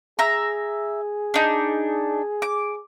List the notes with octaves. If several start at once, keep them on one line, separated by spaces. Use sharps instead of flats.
G#4 E5 A#5
D4 D#4
D6